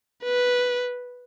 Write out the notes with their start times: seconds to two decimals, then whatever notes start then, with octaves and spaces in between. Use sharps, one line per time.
0.24 B4